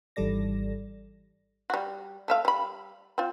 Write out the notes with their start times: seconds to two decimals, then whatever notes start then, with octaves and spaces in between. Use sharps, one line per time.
0.16 G#1 E3 G3 A4 D5 A#6
1.70 G3 F#4
2.28 A3 E5 F5
2.45 G3 B5
3.18 C4 F4